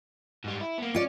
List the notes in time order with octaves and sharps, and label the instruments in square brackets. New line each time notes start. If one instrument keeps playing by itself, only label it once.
[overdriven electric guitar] G#2 G3
E4
A#3 B3
[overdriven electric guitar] C#4 [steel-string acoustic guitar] F4 D5